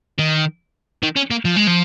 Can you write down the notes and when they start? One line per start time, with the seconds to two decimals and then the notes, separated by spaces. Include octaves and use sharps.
0.19 D#3
1.03 D#3
1.17 C#4
1.31 A#3
1.45 F3
1.56 G#3
1.67 F3